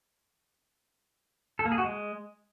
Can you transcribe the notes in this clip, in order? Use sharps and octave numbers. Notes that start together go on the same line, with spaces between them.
A4
A#3
G#4
F#4
G#3